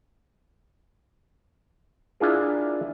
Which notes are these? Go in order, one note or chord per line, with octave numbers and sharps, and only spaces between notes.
D4 E4 F4 G#4 A#4